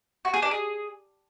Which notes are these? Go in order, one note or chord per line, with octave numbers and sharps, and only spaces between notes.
F#4
G#4
D4
G#4